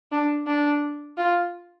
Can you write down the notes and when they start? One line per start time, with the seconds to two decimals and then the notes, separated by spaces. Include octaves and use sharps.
0.12 D4
0.47 D4
1.18 F4